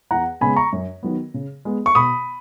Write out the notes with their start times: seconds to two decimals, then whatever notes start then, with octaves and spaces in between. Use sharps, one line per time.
0.11 E2 F#5 A#5
0.41 C#3 G#3 B3 G#5 B5
0.56 A#5 C#6
0.72 F#2
1.03 D#3 F#3 B3
1.34 C#3
1.65 G#3 B3
1.86 C#6
1.95 B2 B5 D#6